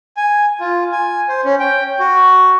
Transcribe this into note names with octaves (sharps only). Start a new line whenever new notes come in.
G#5
F4
G#5
C5
C#4
G5
F#4